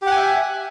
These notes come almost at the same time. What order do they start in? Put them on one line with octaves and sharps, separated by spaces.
G4 F#5 G#5 E5